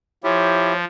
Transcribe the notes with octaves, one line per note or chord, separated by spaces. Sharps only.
F3 E4 G4 C#5